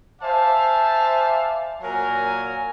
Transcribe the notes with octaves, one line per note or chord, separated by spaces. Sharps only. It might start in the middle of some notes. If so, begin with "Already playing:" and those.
C5 D5 E5 F5 G#5 A5
A#2 F#3 A#4 G#5